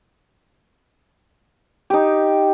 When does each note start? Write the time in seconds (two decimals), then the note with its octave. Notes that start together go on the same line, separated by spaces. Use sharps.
1.90 D#4 G4